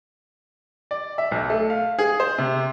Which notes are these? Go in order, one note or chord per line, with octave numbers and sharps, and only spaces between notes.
D5
E5
B1
A3
F5
G#4
C5
C3